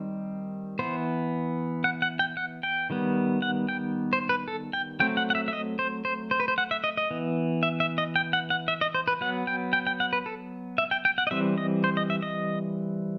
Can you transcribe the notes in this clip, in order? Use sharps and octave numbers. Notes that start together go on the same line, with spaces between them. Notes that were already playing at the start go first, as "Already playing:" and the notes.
Already playing: D#3 G3 C4
E3 B3 C5
F#5
F#5
G5
F#5
G5
D#3 G3 B3
F#5
G5
C5
B4
A4
G5
F#3 A3 C4 G5
F#5
F#5
E5
E5
D#5
C5
C5
C5
B4
C5
F#5
E5
D#5
D#5
E3 B3
E5
E5
D#5
G5
F#5
F#5
E5
D#5
C5
B4
F#3 B3 F#5
G5
G5
G5
F#5
B4
A4
E5
G5
G5
F#5
D#5
E3 G3 C4 E5
D#5
C5
D#5
E5
D#5